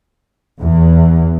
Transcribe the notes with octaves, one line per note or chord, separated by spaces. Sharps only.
E2